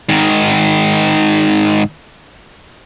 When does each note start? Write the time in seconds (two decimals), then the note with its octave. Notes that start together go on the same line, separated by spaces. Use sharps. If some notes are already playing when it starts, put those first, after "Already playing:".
0.09 G#2 D#3